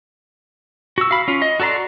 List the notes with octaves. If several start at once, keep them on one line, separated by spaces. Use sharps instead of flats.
F#4 E6
F5 B5
C#4 F4
D#5
F#4 A4 D5 A#5 C6